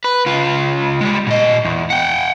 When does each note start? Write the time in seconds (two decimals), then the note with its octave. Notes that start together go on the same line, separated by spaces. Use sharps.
0.04 B4
0.26 C#2 F4
1.01 G3 G#3
1.27 A#2 D#5
1.65 E2
1.90 F#5 G5